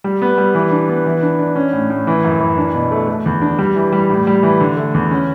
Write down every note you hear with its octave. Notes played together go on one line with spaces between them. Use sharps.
G3
B3
G3
E3
D4
B3
E3
D4
D4
C#4
A2
A2
E3
F#2
E3
D4
B2
A3
A3
E2
D4
G3
E3
G3
A2
G3
E3
D3
A3
E2
C#4